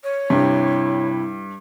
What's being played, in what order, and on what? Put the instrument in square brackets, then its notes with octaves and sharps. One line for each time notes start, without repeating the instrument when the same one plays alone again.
[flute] C#5
[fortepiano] G2 [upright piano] C3 [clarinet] E4